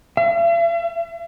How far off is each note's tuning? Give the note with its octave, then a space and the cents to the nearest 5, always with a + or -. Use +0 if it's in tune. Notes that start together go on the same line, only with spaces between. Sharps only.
E5 +45